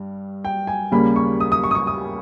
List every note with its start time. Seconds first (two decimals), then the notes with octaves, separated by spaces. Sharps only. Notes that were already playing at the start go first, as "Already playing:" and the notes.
Already playing: G2 G3
0.45 G5
0.67 G#5
0.92 D#2 C#3 G3 A#3 B5
1.16 C#6
1.40 D#6
1.52 D#6
1.64 C#6
1.71 D#6
1.75 C#6
1.87 D#6